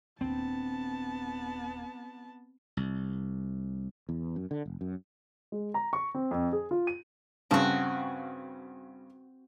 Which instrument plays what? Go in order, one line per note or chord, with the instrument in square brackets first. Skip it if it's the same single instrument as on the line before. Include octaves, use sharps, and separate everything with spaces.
[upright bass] D#1 D4 [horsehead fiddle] B3 A5 [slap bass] C4
[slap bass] C2
[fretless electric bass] E2
F#2
D3
F1
F#2
[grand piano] G#3
A#5
C#6
C4
F2
G#4
F4
D#7
[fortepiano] G2 C#3 A5 [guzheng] C4 F#4